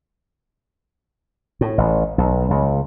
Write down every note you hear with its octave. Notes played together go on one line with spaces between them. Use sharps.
A2
A1
B1
C#2